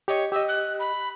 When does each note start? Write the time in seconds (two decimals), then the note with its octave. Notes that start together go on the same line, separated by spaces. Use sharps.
0.08 G4 C#5 D#5
0.32 G4 D#5 E6
0.48 F#6
0.79 B5